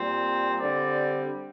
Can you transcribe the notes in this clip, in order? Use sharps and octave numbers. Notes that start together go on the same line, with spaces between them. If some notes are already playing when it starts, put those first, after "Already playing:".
Already playing: A#2 G3 C4
D3 G3 C4 D5